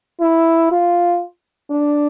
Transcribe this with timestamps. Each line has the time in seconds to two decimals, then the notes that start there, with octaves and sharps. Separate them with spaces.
0.21 E4
0.72 F4
1.70 D4